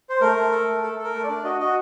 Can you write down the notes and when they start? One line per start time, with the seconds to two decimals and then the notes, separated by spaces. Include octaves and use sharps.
0.09 C5
0.21 A3 A#4
0.37 A3
0.51 A4
0.68 A3
0.83 A4
0.99 A4 A#4
1.14 A3
1.24 D5
1.29 D4
1.44 F#4 D#5
1.60 F#4 D#5